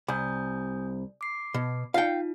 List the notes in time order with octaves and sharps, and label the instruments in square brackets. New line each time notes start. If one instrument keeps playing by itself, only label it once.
[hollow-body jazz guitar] C2 [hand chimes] G#5 D#6 G6
[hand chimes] D6 C7
[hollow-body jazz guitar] B2
[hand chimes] D#4 F4 [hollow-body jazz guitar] F5 G5